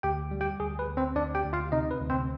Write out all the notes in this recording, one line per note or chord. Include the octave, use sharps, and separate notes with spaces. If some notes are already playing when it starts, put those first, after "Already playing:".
D2 G4 G5
G3
G4 G5
D2 G#4
B4
D2
C4 C5
D2 D4 D5
G4 G5
D2
F4 F5
C3 D#4 D#5
B4
D2
C4 C5